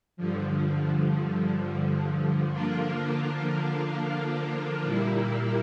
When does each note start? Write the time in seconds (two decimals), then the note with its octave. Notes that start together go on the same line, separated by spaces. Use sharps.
0.17 G2 D3 F3
2.50 D3 F3 A#3 D4 F4
4.83 A#2 G3 A#3 E4